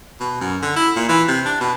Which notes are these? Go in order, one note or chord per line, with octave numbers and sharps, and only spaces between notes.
B2
F#2
D3
E4
A#2
E3
C3
D4
B2